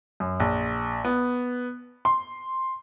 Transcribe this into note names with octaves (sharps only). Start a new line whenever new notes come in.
F#2
A#1
B3
C6